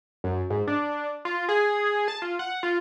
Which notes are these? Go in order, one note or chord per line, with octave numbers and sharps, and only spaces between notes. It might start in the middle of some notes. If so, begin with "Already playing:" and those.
F#2
G#2
D4
F4
G#4
A5
F4
F#5
F4